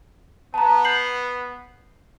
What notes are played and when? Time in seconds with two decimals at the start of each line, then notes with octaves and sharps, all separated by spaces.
0.54 B3 A5 A#5
0.85 G6 C7 F#7